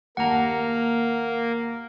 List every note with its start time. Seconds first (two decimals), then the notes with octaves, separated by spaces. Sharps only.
0.17 D#2 A#3 F#5 A5 A#5